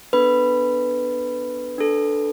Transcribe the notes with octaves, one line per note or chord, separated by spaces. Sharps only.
B3 D4 A4 B4 B5
D4 A4